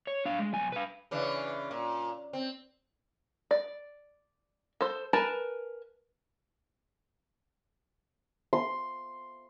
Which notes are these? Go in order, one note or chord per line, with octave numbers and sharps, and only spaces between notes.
C#5
D4 F5
G#3
B1 G#5
B4 F5
C#3 E3 D4
A#2
C4
D5
A4 C5
A#4 B4 G#5 A5
C6